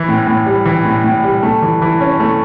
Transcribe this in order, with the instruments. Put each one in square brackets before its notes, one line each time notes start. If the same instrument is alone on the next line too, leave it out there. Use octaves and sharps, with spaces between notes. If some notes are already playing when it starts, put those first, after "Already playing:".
Already playing: [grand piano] E3
A2
A2
G3
E3
A2
A2
G3
A3
E3
E3
C#4
A3